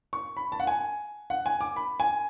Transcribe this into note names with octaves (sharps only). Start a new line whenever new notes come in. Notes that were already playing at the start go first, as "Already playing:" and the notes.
C#6
B5
A5
F#5
G#5
F#5
G#5
D6
B5
G#5